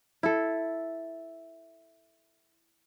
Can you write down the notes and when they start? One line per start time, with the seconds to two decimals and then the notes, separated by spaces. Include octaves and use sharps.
0.23 E4 A4